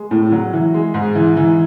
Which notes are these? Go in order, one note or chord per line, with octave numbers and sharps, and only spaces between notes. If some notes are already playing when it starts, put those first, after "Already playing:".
Already playing: G#3
A2
F#3
E3
G#3
G#2
E3
E3